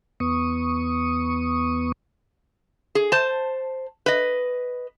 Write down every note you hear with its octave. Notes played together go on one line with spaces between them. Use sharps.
E2 B3 C#6 D#6
G#4
C5 A5
B4 D#5